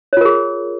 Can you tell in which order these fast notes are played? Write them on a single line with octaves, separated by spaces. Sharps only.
C#5 F4 A#4 G#4